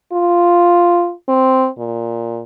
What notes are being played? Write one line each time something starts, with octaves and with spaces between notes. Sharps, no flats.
F4
C4
A#2